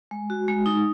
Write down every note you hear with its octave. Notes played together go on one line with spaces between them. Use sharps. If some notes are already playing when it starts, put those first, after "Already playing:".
G#3
F#4
G#3
D#4